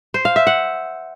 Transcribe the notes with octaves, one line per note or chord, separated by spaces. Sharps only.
C5
F5
E5
F#5